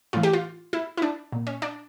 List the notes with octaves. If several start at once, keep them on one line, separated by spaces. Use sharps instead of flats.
A2 E3 F4
G4
F4
E4
E4
D4
A#2
C#4
D4